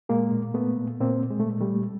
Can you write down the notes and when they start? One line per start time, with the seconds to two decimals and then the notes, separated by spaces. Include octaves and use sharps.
0.09 A#2 G#3 A#3
0.32 A#2
0.54 A#2 A3 B3
0.78 A#2
1.00 A#2 A#3 C4
1.23 A#2
1.30 G#3
1.39 A3
1.46 A#2 G#3
1.61 G3 A3
1.68 A#2